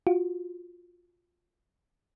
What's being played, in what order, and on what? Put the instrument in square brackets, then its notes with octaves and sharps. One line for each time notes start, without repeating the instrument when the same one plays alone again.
[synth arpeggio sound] F4 F#4